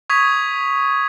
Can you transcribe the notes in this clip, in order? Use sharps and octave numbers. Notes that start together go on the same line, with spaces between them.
C#6 D#6 G#6 B6 F7